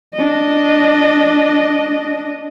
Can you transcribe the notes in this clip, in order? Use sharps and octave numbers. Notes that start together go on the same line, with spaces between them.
D4 D#5